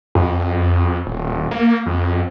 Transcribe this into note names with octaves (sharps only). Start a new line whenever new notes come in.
F2
D#1
A#3
F2